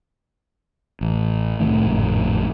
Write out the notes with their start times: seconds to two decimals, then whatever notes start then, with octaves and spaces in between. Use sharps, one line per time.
1.01 A1
1.60 C2 A2 D#3 A3
1.85 G#1 F2 A2 C#3